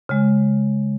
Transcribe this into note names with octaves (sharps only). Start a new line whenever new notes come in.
C#3 G#3